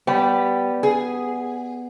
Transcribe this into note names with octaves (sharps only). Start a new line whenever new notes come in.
G3 B3
G#4